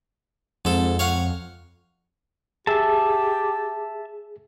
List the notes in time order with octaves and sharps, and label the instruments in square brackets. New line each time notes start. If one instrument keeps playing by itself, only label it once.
[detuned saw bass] F2 [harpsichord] G#2 A4
[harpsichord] C#5 F5 F#5
[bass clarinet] G4 [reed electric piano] G#4 [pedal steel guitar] E5 A5